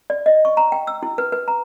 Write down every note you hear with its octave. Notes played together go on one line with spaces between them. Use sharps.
D5
D#5
C#6
A#5
G5
E6
E4
B4
B4
A#5